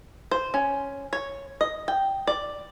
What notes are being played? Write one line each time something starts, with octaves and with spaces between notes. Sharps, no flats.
C5
C#4
C#5
D#5
G5
D5